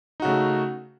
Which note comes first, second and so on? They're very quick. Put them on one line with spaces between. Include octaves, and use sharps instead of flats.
D#4 F#4 C#3 A3